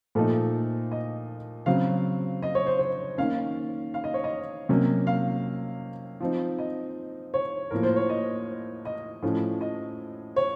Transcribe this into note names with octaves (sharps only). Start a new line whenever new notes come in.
A#2 F3 A3 D#4 A4
D#5
C#3 F#3 C4 F5
D#5
C#5
C5
C#5
D#3 A#3 C#4 F5
F5
D#5
C#5
D#5
C3 F#3 A#3 C#4
F5
F3 C4 D#4
D#5
C#5
A2 F3 A#3 A#4
C5
C#5
D#5
D#5
A2 F3 A3 C#4
D#5
C#5